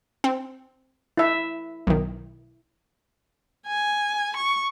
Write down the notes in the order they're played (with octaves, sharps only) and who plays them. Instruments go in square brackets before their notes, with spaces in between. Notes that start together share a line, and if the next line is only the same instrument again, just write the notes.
[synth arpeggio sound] C4
[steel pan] E4 E5
[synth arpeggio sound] B1 D#3
[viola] G#5
C#6